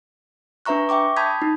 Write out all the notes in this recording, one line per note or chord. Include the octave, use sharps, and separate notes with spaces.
D4 B4 E5 A#5 C#6 F#6
E5 G5 C#6 D6
A5 B5 D#6 G6 G#6 B6
D#4